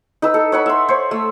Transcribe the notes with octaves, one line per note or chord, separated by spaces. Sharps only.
D#4 B4 E6
A4
C#5 F#5 B5
E5 C6
C5 C#5
A3